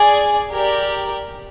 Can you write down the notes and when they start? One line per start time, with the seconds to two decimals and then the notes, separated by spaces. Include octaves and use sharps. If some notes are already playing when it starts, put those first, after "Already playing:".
Already playing: G#4 D5 G#5
0.51 G4 A#4 D5